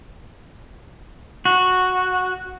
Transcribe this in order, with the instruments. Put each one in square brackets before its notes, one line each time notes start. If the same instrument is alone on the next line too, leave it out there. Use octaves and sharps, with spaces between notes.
[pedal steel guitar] F#4